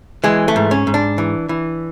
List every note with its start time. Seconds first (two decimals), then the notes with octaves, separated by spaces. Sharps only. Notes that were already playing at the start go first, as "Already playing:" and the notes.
0.24 E3 G#3
0.48 A3
0.56 G#2
0.71 C#4
0.87 G#2
0.94 D4
1.18 E3
1.49 E3